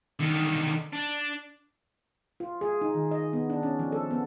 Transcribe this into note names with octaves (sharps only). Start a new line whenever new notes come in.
D3 D#3
D4
F4
G#4
D#4
D#3
D#5
B3
D4
C#4
F3
A4
B3